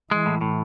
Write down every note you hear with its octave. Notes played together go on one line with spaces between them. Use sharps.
E3 G#3
A2
A2